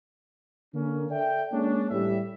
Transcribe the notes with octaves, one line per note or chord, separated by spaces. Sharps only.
D3 A#3 C#4
A4 D5 E5 G5
G#3 A#3 C#4 D4
A1 G3 E5